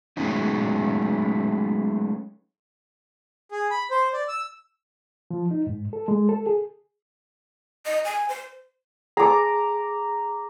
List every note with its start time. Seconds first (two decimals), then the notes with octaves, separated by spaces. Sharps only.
0.17 F#3 G#3 A3 B3 C#4 D#4
3.51 G#4
3.71 B5
3.91 C5
4.13 D5
4.28 E6
5.31 F3
5.51 D#4
5.67 G#2
5.93 A4
6.08 G#3
6.29 A4
6.46 G#4
7.86 D#5
8.05 G#5
8.29 C5
9.17 G#4 A4 A#5 D6